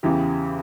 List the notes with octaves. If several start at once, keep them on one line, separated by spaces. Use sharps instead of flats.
E2 C#3 E3 G4